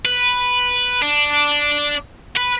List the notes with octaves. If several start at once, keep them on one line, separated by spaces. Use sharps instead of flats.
B4
D4
B4